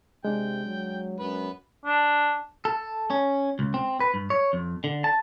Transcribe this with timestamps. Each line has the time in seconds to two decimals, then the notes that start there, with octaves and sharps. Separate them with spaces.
0.25 C3 G#3 D4 G5
0.65 F#3
1.20 F#2 B3 B4
1.85 D4
2.65 A4
3.10 C#4
3.59 C#2
3.74 C4
4.00 B4
4.14 G2
4.30 C#5
4.53 F2
4.84 D3
5.04 A5